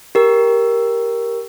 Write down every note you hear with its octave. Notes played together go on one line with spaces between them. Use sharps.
G4 A#4